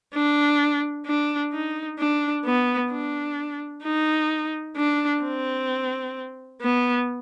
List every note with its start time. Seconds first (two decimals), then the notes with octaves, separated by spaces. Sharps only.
0.14 D4
1.06 D4
1.53 D#4
1.99 D4
2.45 B3
2.91 D4
3.84 D#4
4.76 D4
5.23 C4
6.61 B3